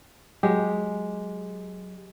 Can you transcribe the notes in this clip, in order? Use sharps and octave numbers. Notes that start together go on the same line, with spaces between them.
F#3 G#3 G4